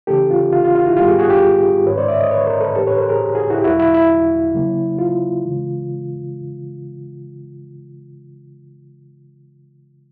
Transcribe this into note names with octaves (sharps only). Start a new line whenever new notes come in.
C#3 E3 A3 C#4 G4 A4
F4
F4
F4
F4
E4 F#4
G#2 D#3 G3 B3 F4 G4
F#4 G#4
F#4 G#4
F4 G4
G#2 D#3 G#3 C#4 B4 C#5
C5 D5
D5 E5
C#5 D#5
B4 C#5
A#4 C5
A4 B4
A2 E3 A3 D4 G4 A4
B4 C#5
A#4 C5
G#4 A#4
F#4 G#4
E4 F#4
G4
E2 B2 F#3 E4 F#4
E4 F#4
E4
C#3 F#3 A#3
F4
C#3 E3 G#3